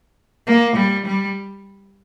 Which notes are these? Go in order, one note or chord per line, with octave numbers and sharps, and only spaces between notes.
A#3
G3
G3